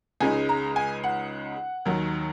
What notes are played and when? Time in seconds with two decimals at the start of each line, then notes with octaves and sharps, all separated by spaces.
0.21 C#2 C#3 G#3 D#4 G#5
0.49 A#5
0.76 G#5
1.04 F#5
1.85 D#2 D#3 F#3